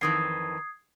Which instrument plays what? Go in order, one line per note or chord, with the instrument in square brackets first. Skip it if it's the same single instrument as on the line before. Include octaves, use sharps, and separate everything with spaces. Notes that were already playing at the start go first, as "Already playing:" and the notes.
[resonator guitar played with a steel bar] F2 D#3 E3 [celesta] D#6 G#6 C7